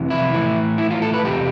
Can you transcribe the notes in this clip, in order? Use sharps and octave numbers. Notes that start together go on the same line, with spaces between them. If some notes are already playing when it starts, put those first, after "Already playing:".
Already playing: F2 C3 E3
E4
A2 E3
E4
F4
A4
B4
E2 C3 G4